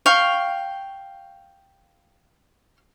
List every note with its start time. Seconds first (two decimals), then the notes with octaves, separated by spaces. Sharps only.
0.06 F5 G5 C#6